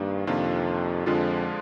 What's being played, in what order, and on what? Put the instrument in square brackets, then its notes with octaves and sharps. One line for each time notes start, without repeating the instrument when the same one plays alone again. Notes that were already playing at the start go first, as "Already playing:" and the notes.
Already playing: [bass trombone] G2 [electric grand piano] D#3 A#3 D4
[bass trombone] F2 [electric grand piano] C3 D#3 A#3 D4 F4
[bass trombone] F2 [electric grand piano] D3 F3 G#3 D4 F4